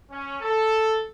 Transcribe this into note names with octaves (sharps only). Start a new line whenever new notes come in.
C#4
A4